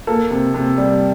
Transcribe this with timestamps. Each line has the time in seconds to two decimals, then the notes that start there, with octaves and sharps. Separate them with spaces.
0.07 A#3 A4
0.31 C3
0.54 C3
0.78 G3